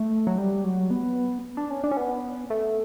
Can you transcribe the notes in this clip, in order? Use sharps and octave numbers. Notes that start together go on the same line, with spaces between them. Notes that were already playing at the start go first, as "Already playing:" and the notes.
Already playing: A3
F#3
G3
F#3
B3
D4
C#4
D4
C#4
B3
A3